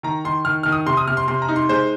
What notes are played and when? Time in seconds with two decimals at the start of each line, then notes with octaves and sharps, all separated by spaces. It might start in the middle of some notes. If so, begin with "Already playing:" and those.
0.03 D#3 A#5
0.25 D#3 C6
0.45 D#3 F6
0.63 D#3 F6
0.72 D#6
0.86 C3 C6
0.97 D#6
1.07 C3 F6
1.17 C6
1.27 C3 C6
1.42 A#5
1.49 D#4
1.56 C6
1.69 G#3 C5